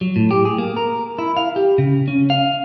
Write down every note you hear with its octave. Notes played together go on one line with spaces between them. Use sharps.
F#3
A2
G4
G#4
A#3
A#4
E4
F5
G4
C#3
C#4
F5